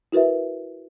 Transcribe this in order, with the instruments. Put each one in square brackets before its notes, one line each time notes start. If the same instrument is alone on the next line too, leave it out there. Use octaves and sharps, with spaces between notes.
[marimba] E4 F#4 A#4 B4 E5